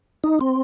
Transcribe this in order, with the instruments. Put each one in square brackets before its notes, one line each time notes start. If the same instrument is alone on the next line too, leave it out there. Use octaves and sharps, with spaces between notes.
[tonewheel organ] D#4
C4